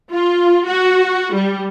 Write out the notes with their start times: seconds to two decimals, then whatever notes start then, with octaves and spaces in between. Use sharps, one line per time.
0.11 F4
0.65 F#4
1.34 G3